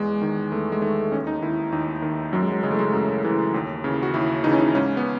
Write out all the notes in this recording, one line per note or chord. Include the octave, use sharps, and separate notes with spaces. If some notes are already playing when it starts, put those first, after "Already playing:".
Already playing: E2 G#3
D#3
E2 A3
G#3
D#3 A3
D#2 C#4
D#4
D#3 E4
D#2 D#4
D#3
F#2 F#3
G#3
F#3
C#3 E3 G#3 A3
G#3
F#2
C#3 E3
D#2
C#3 E3
F#4
D#2 E4
C#3 E3 D#4
C#4
D#4
G#2 C#4
B3